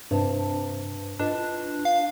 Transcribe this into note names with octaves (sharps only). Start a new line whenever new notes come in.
G2 C3 A5
D4 F4 B4 D#5
F5